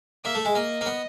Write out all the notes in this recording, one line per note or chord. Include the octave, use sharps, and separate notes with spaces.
A#3 E5
A3
G#3
A#3 D#5
A#3
B3